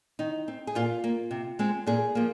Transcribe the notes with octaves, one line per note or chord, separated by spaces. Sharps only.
D#3 D#4
C4
G#4
A#2 F4
A#3
C3
G#3 C4
A#2 G#4
F3 A#3